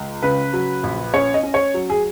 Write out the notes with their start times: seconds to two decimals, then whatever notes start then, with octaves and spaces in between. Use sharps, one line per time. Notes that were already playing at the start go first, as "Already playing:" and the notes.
Already playing: C#2
0.23 C#3 B4
0.53 F#3
0.83 A#1
1.14 C#4 C#5
1.34 D#5
1.43 C#4
1.54 C#5
1.74 F#3
1.90 G#4